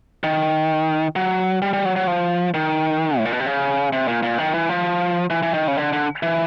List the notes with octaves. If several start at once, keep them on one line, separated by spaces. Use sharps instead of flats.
D#3
F#3
G3
G3
F#3
F#3
F3
D#3
A2
A#2
B2
C3
C#3
C3
A#2
A#2
D#3
E3
F3
E3
E3
D#3
C#3
D3
D3
E3